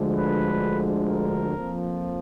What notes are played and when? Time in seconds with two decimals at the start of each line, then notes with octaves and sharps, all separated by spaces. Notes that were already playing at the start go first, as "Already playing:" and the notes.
Already playing: D2 D3 F3 G#3
0.14 B4
1.09 A#4
1.56 F2 F3 A#3